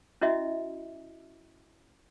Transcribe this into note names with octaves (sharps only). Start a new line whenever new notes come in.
C#4 E4 F#4 D#5 E5